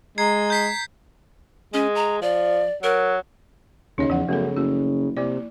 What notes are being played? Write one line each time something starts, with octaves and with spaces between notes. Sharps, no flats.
G#3 A#5 G#6 C7
G6 B6 C7
G#3 C#4
A#5
F3 D5
F#3 A#4
D#2 C#3 D#4 C#5 D#5
E2 F3 F#5
F#2 C#3 A3 B3 A4
F#1 F#4
C3 A#3 E4 D5